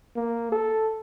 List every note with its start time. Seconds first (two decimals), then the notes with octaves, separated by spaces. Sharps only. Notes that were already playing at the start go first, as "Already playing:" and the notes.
0.16 A#3
0.52 A4